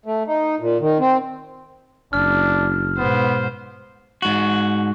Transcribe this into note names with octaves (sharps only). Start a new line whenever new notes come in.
A3
D#4
A#2
D#3
C4
F#1 D4 F6
G#2 B2 B3 C5
G#2 F#4